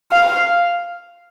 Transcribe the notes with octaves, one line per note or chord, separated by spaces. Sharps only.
F5